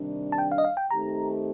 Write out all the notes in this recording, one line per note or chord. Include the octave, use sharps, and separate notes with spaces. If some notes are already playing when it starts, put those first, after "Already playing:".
Already playing: C3 D#3 G3 D4
A5
G5
F5
D#5
F5
G5
D#3 A3 C4 D#4 G4 A#5